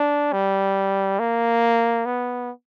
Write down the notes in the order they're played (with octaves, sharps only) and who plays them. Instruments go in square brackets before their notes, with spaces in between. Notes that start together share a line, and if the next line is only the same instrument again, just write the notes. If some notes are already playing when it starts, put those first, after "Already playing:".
Already playing: [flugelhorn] D4
G3
A#3
B3